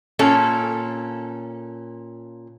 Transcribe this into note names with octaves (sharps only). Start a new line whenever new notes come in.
A#2 C#4 A4